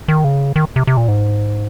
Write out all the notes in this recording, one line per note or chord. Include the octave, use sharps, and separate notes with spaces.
D#3
C#3
D#3
C3
C3
A#2
G#2